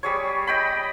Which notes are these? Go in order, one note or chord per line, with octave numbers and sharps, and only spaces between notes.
G3 G#4 C#5
D#5 G5 B5